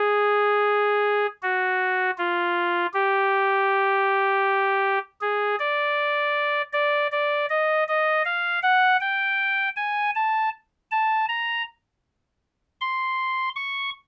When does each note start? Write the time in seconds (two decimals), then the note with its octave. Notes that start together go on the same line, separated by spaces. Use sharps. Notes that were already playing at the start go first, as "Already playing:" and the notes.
Already playing: G#4
1.42 F#4
2.18 F4
2.94 G4
5.21 G#4
5.60 D5
6.73 D5
7.12 D5
7.49 D#5
7.88 D#5
8.25 F5
8.63 F#5
9.00 G5
9.76 G#5
10.15 A5
10.91 A5
11.29 A#5
12.81 C6
13.56 C#6